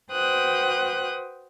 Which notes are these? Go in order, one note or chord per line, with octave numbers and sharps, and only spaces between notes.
F#4 B4 C5 G5 D#6 F#6